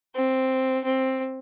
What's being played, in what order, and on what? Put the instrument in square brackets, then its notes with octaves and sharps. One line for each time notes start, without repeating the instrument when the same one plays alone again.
[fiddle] C4
C4